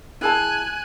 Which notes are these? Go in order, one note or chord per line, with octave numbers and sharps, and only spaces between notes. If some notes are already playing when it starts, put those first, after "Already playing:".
E4 G#4 G#5 A5 F#6